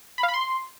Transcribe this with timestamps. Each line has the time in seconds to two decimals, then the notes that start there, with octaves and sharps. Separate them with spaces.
0.18 B5
0.23 F5
0.28 B5
0.34 C6